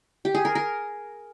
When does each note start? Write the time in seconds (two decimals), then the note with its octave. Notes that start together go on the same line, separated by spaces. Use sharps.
0.25 G4
0.35 G#4
0.45 A#4
0.55 A#4